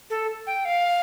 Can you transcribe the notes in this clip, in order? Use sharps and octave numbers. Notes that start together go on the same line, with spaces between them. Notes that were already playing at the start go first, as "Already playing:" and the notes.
A4
G5
F5